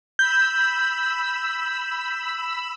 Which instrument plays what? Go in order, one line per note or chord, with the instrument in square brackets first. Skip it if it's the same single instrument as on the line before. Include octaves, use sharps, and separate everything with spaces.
[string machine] B5 E6 [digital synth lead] G6